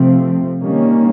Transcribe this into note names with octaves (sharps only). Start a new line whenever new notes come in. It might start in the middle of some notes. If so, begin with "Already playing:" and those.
Already playing: C3 F3 A3 C4
D#3 G3 A#3 C#4